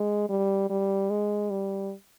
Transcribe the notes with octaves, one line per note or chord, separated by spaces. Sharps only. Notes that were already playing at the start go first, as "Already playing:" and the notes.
Already playing: G#3
G3
G3
G#3
G3